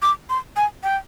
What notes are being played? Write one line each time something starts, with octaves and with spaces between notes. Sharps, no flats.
D6
C6
G#5
G5